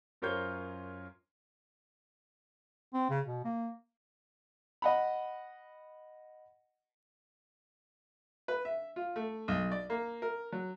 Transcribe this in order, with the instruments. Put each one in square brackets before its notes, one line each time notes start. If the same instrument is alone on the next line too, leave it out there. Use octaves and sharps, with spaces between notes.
[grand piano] F#2 F4 A#4 C5 C#5 G6
[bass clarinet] C4
C#3
B2
A#3
[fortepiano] D#5 F#5 B5
B4
E5
F4
A3
B1
D5
A#3
A#4
F#3